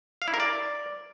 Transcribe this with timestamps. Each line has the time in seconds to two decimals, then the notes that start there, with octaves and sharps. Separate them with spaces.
0.22 F5
0.28 E4
0.34 A#4
0.40 D5